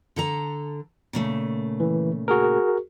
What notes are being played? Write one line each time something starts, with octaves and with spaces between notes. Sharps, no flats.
D3 A4 A#5
A#2 C#3 A3
E3
F#4 G#4 A#4